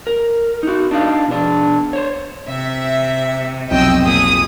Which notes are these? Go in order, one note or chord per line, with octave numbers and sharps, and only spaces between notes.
A#4
D#4 F#4
D4 D#4 D5 D#5 F5
B2 D4
C5 C#5
C3 E5
B1 F2 C3 D#5 G5 E6
A#2 G#4 D#6